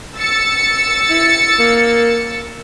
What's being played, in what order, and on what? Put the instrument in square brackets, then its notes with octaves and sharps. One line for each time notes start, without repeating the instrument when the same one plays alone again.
[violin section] E6 A6 C#7
[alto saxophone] E4
A#3